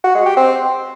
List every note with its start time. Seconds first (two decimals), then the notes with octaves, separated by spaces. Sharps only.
0.04 F#4
0.15 G#3
0.26 G4
0.37 C4